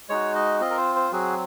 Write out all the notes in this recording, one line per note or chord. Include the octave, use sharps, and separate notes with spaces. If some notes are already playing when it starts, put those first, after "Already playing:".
G#3 D#4 F#4 C#5
D#5
C4 F4 D#5
A#4
C5
C5
F#3 C4 F#4 G#4